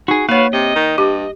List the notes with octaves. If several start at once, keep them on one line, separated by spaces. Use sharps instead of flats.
D#4 F#4 G#4
A#3 F#4 B4 C#5 F5
C3 D#5
D#3
G2 G4